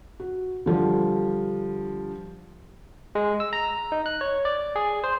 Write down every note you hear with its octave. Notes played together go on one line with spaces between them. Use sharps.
F#4
D3 F3 G3
G#3
E6
A#5
D#4
F#6
C#5
D5
G#4
C5